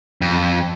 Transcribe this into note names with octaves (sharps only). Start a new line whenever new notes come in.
F2